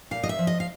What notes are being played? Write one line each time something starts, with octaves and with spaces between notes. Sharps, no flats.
A#2 F5
D#5
E5
F3
D#5
F5